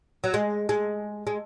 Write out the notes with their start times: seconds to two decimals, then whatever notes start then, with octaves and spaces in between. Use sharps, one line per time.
0.24 F#3
0.34 G#3
0.69 G#3
1.27 G#3